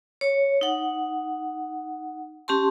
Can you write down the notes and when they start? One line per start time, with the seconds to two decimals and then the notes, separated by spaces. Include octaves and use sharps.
0.21 C#5
0.61 D#4 F#5
2.48 C#4 G4 A5 C6